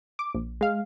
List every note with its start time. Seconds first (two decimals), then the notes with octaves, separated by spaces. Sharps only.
0.19 D6
0.35 A#1
0.61 G#3 F5